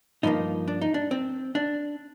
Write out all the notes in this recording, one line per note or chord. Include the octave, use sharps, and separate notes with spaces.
G2 F3 A#3 D#4
D4
D#4
D4
C4
D4